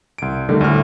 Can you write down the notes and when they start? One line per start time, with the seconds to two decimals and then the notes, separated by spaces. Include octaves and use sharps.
0.18 C2 D7
0.49 D3 D#3 G3 A3
0.61 D2 A2 F6